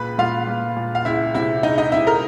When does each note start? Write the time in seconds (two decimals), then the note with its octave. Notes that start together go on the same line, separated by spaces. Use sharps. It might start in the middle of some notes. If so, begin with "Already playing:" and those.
Already playing: C#2 A#2 B4 B5
0.18 A#2 F4 F5
0.47 A#2
0.76 A#2
0.95 F5
1.05 C#2 E4 E5
1.34 C3 E4 E5
1.63 C#2 D#4 D#5
1.78 D#4 D#5
1.92 C3 E4 E5
2.07 A#4 A#5